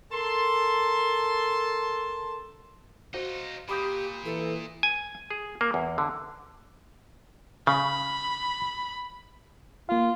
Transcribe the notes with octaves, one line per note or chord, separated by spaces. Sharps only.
A4 A#4 A5 C6
D#4 F4 F#4 C5
A#2 G4 B5 D#6 G6
E3 A4
G#5
G#4
A#3
E2
D3
C#3 B5
A#3 F4 F5